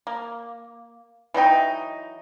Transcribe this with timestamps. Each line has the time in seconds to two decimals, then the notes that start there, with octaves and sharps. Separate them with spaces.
0.07 A#3
1.34 E3 F#3 D#4 G5